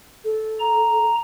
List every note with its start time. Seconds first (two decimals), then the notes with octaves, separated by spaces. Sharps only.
0.25 A4
0.59 A#5